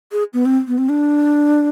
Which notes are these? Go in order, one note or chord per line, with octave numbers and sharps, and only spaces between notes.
G#4
B3
C4
B3
C4
D4